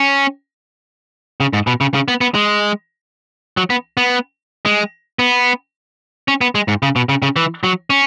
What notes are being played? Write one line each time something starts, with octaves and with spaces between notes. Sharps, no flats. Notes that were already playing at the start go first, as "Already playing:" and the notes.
Already playing: C#4
C#3
G#2
B2
C#3
C#3
B3
B3
G#3
F#3
B3
B3
G#3
B3
C#4
B3
G#3
G#2
C#3
B2
C#3
C#3
E3
F#3
C#4